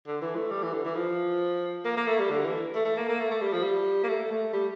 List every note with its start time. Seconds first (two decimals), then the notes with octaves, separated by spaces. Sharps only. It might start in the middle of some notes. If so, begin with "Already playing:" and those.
0.07 D3
0.22 E3
0.36 A3
0.51 G3
0.63 E3
0.73 D3
0.84 E3
0.96 F3
1.85 A#3
1.97 A#3
2.07 A3
2.19 G3
2.30 D3
2.45 E3
2.75 A3
2.85 A3
2.97 A#3
3.08 A#3
3.20 A3
3.31 A3
3.41 G3
3.53 F3
3.63 G3
4.04 A#3
4.08 A3
4.31 A3
4.53 G3